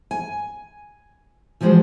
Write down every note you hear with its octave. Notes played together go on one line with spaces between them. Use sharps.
G#5
E3 F3 G3 G#3 F#4 C5